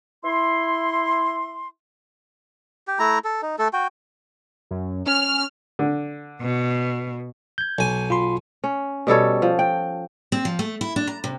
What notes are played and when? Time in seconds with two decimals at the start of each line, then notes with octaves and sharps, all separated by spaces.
0.23 E4 C6
2.88 G4
2.99 A3 E4 A#5
3.24 A4
3.42 D#4
3.59 A3 A4
3.73 F#4 G5
4.71 F#2
5.07 C#4 F6
5.79 D3
6.41 B2
7.58 G6 G#6
7.79 B1 G#5
8.10 F4 B5 C6
8.64 C#4
9.07 B2 G3 A4 C#5
9.42 F3
9.59 G5
10.32 C4
10.45 F3
10.59 A3
10.81 E4
10.96 D4
11.07 A#5
11.24 C3